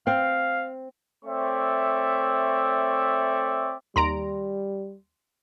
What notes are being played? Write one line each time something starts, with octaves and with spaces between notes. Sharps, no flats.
C4 F5
A3 C4 C#5 D5 E5 C#6
D#2 G3 A#5 C6 D7